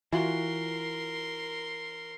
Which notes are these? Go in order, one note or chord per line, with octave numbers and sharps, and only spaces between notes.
E3 F4 F#4 A#4 F#5 C6